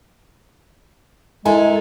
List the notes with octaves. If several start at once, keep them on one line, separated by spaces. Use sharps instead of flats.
G#3 E4 A4 A#4 G#5